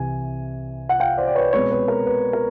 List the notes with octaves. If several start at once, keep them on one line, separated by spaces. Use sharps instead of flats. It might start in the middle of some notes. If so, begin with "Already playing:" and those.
Already playing: C2 C3 E3 G#5
F#5
F5 G5
C5 D5
D5
B4 C#5
B2 G#3 C4 B4 C#5
B4
A#4
B4
A#4